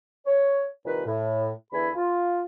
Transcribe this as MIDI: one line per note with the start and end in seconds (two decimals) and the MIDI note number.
0.26 0.64 73
0.85 1.03 36
0.85 1.03 46
0.85 1.03 51
0.85 1.03 71
1.06 1.49 45
1.72 1.89 40
1.72 1.89 50
1.72 1.89 52
1.72 1.89 64
1.72 1.89 80
1.72 1.89 83
1.95 2.44 65